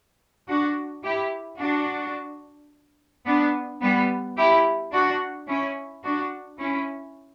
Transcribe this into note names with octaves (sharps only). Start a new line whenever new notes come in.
D4 F#4
E4 G4
D4 F#4
B3 D4
G3 B3
E4 G4
D4 F#4
C#4 E4
D4 F#4
C#4 E4